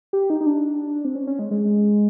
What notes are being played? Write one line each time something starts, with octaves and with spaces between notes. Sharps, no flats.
G4
D#4
D#4
D4
C4
C#4
C#4
G#3
G#3